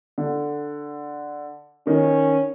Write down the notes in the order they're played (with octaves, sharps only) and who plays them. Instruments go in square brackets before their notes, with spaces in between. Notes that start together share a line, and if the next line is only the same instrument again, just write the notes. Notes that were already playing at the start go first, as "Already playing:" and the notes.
[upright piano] D3
[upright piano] D#3 [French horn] C#4